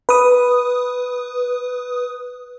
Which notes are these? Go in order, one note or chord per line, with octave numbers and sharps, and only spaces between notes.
B4 D#6